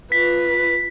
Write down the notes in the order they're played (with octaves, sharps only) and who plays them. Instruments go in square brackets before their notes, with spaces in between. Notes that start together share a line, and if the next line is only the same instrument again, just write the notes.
[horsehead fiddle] F4 B4 [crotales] B6